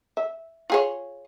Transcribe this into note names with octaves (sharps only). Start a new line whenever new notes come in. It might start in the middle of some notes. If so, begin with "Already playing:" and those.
E5
F4 G#4 C#5